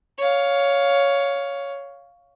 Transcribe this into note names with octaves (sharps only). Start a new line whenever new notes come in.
C#5 F5